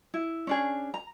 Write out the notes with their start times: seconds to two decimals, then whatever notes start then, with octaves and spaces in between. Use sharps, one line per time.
0.14 E4
0.47 C#4 D4 G#4
0.94 A#5